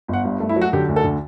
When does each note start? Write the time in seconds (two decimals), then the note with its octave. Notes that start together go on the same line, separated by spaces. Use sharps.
0.08 G1 F#5
0.25 G2
0.40 A3
0.49 E4
0.56 F#3
0.61 F#4
0.73 D3 G4
0.88 D2
0.96 A4
1.04 D3